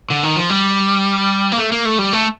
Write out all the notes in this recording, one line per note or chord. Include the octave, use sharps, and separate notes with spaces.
D3
D#3
F3
G3
A#3
A3
A#3
A3
G3
A3